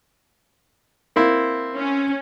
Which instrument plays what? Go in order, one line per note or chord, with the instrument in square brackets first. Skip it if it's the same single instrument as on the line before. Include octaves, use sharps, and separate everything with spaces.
[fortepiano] A#3 C4 E4
[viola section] C#4